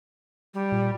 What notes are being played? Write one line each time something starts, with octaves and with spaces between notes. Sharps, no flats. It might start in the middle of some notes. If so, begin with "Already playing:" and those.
G3
A#2